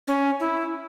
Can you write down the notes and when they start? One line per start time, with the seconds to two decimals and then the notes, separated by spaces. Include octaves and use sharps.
0.08 C#4
0.40 E4